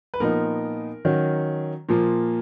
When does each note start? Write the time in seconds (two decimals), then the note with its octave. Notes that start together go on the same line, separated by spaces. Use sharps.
0.14 B4
0.20 A#2 F3 B3 D#4 A#4
1.05 D#3 F#3 C#4
1.89 A#2 F3 A#3